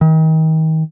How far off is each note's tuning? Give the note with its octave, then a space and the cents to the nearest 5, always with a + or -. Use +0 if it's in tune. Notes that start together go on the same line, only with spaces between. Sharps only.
D#3 +35